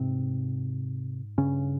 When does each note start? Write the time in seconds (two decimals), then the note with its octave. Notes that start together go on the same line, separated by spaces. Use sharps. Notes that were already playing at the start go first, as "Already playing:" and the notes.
Already playing: G#2 C3 C4
1.38 G2 C#3 C#4